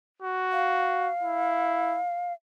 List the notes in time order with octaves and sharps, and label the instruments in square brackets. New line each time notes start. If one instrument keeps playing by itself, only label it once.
[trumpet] F#4
[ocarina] F5
[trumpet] E4